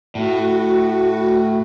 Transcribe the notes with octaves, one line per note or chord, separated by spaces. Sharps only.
A2 F#4